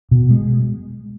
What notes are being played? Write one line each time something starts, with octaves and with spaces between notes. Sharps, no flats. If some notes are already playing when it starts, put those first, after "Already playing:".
B2
G#3